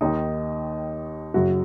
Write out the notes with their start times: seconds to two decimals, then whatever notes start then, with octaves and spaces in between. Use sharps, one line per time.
0.01 D#2 D#3 D#4
1.34 F#1 F#2 C#3 F#4